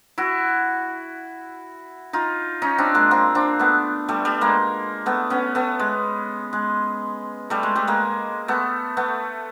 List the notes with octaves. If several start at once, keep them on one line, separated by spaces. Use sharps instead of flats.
E4 F#4
D#4 F4
C#4 D#4
C4 D4
G#3 A#3
A#3 C4
C4 D4
A3 B3
G3 A3
G3 A3
G#3 A#3
A3 B3
B3 C#4
A3 B3
G#3
G#3
G3 A3
G#3
G3 A3
G#3 A#3
A3 B3
A3 B3